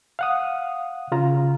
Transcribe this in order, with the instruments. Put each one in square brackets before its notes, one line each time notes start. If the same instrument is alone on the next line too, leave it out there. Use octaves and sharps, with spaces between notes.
[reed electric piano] F5 F#5 D#6
C#3 F4 A#5